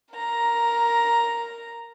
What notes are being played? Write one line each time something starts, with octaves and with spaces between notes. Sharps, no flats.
A#4 A#5